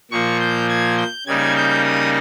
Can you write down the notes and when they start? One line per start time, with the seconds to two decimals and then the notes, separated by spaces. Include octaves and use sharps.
0.11 A#2 F3 A#3 C#6
0.40 G6
0.69 G#6
0.98 G6
1.27 C#3 G3 A#3 D#4 G#6
1.56 G6
1.84 D#6